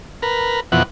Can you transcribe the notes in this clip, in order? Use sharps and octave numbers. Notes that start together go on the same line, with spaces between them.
A#4 B4
F2 B2 E3 F#5